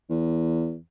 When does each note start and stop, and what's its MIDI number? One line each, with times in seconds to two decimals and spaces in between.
0.09 0.76 40